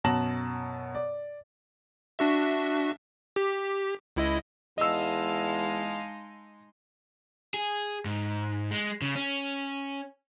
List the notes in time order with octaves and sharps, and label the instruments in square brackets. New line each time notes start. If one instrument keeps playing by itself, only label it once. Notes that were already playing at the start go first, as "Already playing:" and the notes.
[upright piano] F#2 B2 A5 A#6 E7 F#7
D5
[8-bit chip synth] D4 F#4 E5
G4
C#2 E4 D#5
[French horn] E2 [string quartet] G#3 D#4 C6 [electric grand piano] D#5 E6 [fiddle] F5 A5
[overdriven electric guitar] G#4
G#2
G#3
C#3
C#4